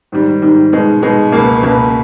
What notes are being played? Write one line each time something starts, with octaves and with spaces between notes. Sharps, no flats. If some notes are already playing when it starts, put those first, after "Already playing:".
G#2 D#3 G3
G#2 D#3 G3
B2 G#3 D#4
B2 G#3 D#4
C#2 B2 A#3
C#2 B2 A#3